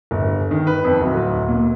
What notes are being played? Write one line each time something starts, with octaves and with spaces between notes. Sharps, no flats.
G1
D#3
B4
F2
D1
A#2